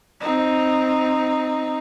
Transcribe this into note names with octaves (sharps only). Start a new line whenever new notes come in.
C4 D#4